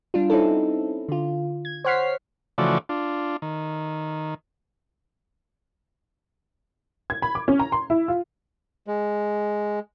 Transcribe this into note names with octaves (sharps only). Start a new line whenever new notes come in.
G3 D4 F4
C4 C#4 D#4 E4 A4
D3 F4
G#6
C5 C#5 F#5 F6 B6 C7
C#3 E3 F3 A3 F#4 D5
D4 F4
D#3
G#6
B5
D6
C#4
A#5
C6
E4
F4
G#3